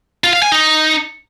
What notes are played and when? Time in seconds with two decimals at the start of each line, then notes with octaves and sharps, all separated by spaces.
0.24 F4
0.33 F5
0.42 G#5
0.52 D#4